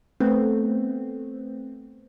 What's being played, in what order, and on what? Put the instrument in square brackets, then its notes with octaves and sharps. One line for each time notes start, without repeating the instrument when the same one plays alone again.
[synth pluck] A3 B3 C4